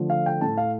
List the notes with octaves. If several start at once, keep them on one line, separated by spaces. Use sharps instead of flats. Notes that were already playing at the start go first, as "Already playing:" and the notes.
Already playing: D3 F3 A3
F5
G5
A2 A3 A5
F5